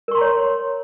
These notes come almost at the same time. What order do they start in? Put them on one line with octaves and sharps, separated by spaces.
A#4 C#6 C6 A#5 C#5